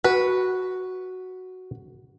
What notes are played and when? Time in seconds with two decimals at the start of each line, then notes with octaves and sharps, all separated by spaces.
0.04 F#4 B4